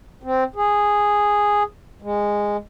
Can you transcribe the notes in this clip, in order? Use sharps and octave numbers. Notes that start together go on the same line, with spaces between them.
C4
G#4
G#3